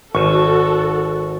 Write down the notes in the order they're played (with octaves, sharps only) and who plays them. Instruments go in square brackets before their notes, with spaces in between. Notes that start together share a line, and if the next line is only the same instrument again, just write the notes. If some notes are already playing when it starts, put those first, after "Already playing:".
[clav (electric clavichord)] G#1 [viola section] F#4 A4 [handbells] C#6